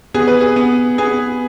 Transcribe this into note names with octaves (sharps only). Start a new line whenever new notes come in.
B3 G#4
B4
G#4
B3
B3 G#4